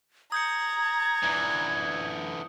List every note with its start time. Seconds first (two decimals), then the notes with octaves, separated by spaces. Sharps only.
0.32 A#5 D#6 G6 G#6 C#7
1.23 D3 E3